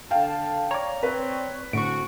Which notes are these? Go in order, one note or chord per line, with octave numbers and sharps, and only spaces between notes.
D3 A4 F5 G5 A5
C#5 D5 A#5
C4 B4
A2 D3 A3 C4 F#4 C#6 D7